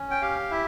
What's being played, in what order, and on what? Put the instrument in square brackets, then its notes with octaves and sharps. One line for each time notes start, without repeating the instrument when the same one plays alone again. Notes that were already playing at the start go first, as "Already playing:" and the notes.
Already playing: [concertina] C#4
G5
G4 F5
E4 E5